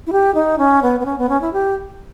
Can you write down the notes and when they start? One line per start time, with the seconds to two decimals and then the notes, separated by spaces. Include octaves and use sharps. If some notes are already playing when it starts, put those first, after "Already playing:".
0.07 E4
0.12 G4
0.35 D#4
0.58 C#4
0.83 B3
1.00 B3
1.05 C#4
1.18 B3
1.29 C#4
1.42 E4
1.53 G4